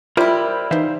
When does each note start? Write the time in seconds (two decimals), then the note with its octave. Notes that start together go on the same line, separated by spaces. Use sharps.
0.17 G3 E4 F4 A#4 C5 E5
0.71 E3 D#4 C5 E5 F5